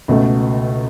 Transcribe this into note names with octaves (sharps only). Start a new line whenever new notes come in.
C#2 B2 A3